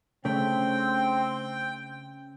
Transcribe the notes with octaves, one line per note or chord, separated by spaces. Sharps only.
C#3 A3 C4 D4 G5